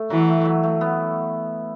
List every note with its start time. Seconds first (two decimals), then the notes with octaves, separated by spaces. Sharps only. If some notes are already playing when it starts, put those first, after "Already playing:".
Already playing: A3
0.10 E3 F#3
0.29 A3
0.45 F#3
0.63 A3
0.81 B3